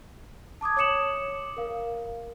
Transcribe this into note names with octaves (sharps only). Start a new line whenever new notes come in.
A5 D6 D#6 G#6
C#5 D6 D#6 C#7 E7 F#7
A#4 F5